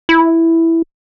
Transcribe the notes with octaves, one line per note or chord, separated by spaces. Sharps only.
E4